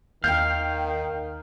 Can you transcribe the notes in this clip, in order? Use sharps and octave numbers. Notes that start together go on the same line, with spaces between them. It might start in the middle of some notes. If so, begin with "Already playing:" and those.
D#2 D#3 F5 G5 G6